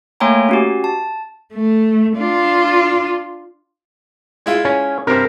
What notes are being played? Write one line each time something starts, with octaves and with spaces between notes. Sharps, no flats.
A3 A#3 C#5 G5 G#5 A#5
C#4 F#4 G4
A5
A3
D4 F4
G#3 E4 F4
C#4
G2 C3 A#4 C5